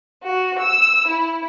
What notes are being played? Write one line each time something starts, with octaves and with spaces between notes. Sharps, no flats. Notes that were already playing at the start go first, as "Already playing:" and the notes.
F#4
E6
E4